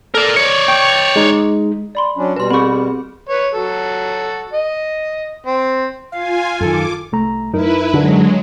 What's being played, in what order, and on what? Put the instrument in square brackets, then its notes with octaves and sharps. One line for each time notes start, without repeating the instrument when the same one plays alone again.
[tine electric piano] A4 [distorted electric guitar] A#4 D5
[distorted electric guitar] C#5 D5 [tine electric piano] C#7
[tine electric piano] G5 C#6
G#3 D#4
[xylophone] D5 B5 C6
[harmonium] F#3 C#4 D4
[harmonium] B2 G3 [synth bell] B4 C6
[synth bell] C4 G#4 [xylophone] B5 C#6
[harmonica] B4 C#5
F#3 F#4 A4
D#5
C4
[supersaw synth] F4 G#5 [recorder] F5
[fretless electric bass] F#2 D#3 [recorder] A4 [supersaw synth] D6
[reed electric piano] C2 A3 A#5
[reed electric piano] F#2 D#4 A#4 [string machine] E4 B4
[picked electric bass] D3 [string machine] F#3 G#3